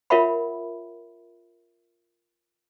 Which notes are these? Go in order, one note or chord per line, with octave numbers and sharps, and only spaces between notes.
F4 A#4 C#5 E5 F#5 B5